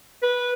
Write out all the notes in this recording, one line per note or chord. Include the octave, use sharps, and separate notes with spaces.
B4